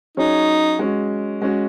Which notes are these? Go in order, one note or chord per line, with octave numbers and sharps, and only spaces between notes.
F#3 C#4 D#4 G#4 C#5
G#3 C#4 F#4
G#3 C#4 F#4